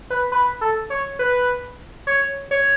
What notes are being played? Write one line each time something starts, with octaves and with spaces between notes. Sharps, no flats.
B4
B4
A4
C#5
B4
C#5
C#5